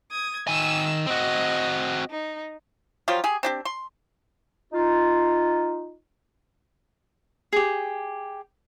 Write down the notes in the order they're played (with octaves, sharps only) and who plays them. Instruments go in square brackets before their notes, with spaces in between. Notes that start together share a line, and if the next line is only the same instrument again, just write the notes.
[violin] D#6 G#6
[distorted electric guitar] D#3 G#5 [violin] E6
[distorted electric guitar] C4 F#4 [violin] D#5
[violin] D#4
[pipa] F3 F#3 F4 G4
G4 G#4
C4 D4 G4
C6
[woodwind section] D#4 F4
[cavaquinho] G4 G#4